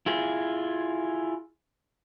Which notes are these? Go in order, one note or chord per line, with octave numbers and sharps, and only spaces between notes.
E4 F4 G#4